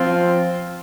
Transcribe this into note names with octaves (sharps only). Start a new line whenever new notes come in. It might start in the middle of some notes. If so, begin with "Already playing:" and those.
Already playing: F3 C4 F4